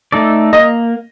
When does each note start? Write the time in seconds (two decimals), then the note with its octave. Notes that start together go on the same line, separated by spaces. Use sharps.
0.12 A3 D#4 A4 D5
0.53 A#3 D#5